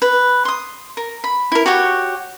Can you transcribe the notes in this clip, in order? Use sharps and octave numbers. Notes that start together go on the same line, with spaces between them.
B4
C6 D#6
A#4
B5
E4 A#4
F#4 G4 C#5 F#5